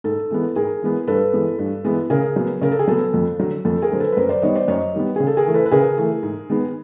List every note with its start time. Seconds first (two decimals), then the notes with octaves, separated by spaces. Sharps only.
0.04 G#2 A4
0.31 E3 G#3 B3
0.56 G#2 G#4 A#4
0.82 E3 G#3 B3
1.07 G2 A4 B4
1.33 E3 G#3 B3
1.59 G2
1.85 E3 G#3 B3
2.10 C#3 G#4 A#4
2.36 F#3 B3
2.62 C#3 A#4
2.71 A4
2.79 G#4
2.88 F#3 B3 A4
3.14 F2
3.40 D3 F#3
3.65 F2 A4
3.82 G#4 A#4
3.91 D3 F#3 C5
4.00 A4 B4
4.13 B4
4.17 F#2 A#4 C5
4.29 C5 D5
4.42 D#3 G3 B3 C#5 D#5
4.55 C5 D5
4.68 F#2 C#5 D#5
4.95 D#3 G3 B3
5.16 C#3 G#4
5.27 A4
5.37 G#4 A#4
5.46 E3 A3
5.54 A4 B4
5.66 B4
5.71 C#3 G#4 A#4
5.97 E3 A3
6.23 G#2
6.50 D#3 G#3 B3